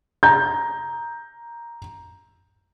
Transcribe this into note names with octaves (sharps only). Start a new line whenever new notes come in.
A#5 G6